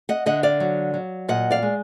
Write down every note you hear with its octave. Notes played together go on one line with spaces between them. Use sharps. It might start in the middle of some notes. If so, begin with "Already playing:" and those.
D#5 F#5
D3 D#5 F#5
D5 F5
F#3
F#3
A#2 D#5 F#5
D5 F5
G#3